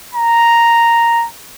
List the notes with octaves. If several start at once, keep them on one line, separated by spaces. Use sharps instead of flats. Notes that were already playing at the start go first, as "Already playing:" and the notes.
A#5